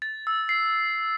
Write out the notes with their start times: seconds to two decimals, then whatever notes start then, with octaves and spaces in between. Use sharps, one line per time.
0.02 A6
0.27 E6
0.49 C7